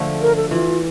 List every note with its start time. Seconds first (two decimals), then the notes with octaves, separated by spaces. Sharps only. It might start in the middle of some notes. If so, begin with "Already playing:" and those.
Already playing: D3 F3 A3
0.22 A#4
0.36 A4
0.51 E3 F4